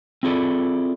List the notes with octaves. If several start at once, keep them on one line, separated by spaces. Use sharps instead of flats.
C4 E4 F4 G#4 A4 D5